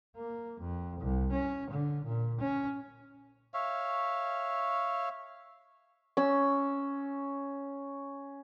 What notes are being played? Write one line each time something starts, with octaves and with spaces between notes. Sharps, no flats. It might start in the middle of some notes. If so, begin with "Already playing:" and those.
A#3
F2
C2
C#4
D3
A#2
C#4
C#5 E5 F5
C#4 E6